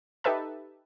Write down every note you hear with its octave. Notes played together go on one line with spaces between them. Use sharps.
D#4 G4 A4 B4 E5 A5